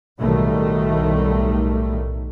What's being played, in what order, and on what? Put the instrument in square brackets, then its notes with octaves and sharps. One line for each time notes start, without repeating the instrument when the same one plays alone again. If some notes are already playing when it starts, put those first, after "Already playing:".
[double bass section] B1 A2 D#3 G3 A3